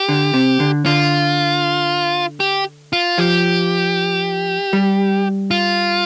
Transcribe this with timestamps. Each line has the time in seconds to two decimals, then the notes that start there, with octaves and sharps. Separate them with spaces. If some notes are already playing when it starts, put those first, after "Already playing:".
Already playing: G4
0.09 D3
0.34 C3
0.60 D3
0.86 D3 F4
2.40 G4
2.93 F4
3.18 F3 G4
4.73 G3
5.51 F4